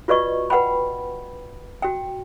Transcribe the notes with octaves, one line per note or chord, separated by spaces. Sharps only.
F4 F#4 B4 D5 D#5 C#6
B4 F#5 G5 B5
F#4 G5